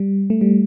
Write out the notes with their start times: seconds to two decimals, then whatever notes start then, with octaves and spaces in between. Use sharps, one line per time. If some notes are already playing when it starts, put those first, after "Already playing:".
Already playing: G3
0.30 A3
0.41 G3